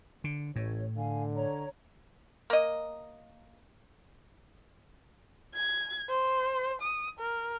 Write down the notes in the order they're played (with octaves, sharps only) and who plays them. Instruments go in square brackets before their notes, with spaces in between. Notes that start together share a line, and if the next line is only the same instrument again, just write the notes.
[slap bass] D3
[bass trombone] A1 [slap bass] A2 [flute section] C#5
[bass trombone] D3 [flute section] F5 G#5
[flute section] C#5 A#5
[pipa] A#3 D#5
[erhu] G#6
C5
D#6
A#4